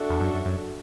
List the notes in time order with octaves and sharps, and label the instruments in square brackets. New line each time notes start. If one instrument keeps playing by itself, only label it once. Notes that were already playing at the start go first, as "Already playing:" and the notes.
Already playing: [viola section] D4 F#4 A4 E5
[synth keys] E2
F#2
F#2
F#2